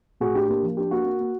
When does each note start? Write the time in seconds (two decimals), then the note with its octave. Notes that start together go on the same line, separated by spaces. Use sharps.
0.20 A2 F#4 G#4
0.35 D4 G4
0.49 A#3 G4
0.63 F3
0.77 D4 G4
0.91 A#3 F#4
1.05 A#3
1.20 A#3